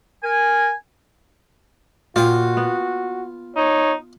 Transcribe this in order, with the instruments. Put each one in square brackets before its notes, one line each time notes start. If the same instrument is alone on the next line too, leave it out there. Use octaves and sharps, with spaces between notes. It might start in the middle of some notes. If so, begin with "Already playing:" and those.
[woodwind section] A#4 G#5
[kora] A#2 [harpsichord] F4 G5 [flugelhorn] F#4
[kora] B3
[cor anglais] D#4 [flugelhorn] C#5